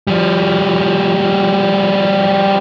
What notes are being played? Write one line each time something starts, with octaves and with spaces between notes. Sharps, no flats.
F3 G3